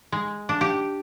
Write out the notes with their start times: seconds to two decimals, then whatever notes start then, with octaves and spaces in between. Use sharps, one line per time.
0.12 G#3
0.49 D4
0.61 G4